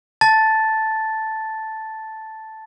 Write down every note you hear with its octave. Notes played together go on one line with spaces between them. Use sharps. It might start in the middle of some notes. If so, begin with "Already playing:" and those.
A5 A6